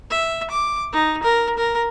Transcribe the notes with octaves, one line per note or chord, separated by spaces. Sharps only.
E5
D6
D#4
A#4
A#4